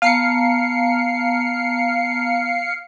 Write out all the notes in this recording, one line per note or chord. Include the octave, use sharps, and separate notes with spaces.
B3 F5 A5 A#5 C7 C#7